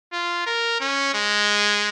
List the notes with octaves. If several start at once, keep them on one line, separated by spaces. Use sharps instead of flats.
F4
A#4
C#4
G#3